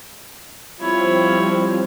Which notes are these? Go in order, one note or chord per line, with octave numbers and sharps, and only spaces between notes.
F3 G3 C4 E4 C#5